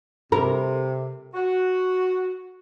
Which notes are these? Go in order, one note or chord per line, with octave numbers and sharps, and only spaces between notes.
C3 A#4
F#4